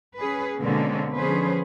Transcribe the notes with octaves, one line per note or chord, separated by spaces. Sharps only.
C#4 G#4 B4
B2 D3 G#3 A#3 C4 C#4
D3 F3 C#4 G#4 B4 C5